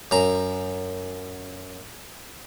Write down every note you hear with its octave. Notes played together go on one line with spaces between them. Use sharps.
F#2 A#5